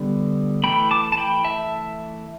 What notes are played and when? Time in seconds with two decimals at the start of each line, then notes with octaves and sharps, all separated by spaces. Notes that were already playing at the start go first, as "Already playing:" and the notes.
Already playing: D3 G3 B3
0.63 E3 A3 G5 B5
0.91 A5 D6
1.12 A5
1.17 G5 B5
1.44 E5 A5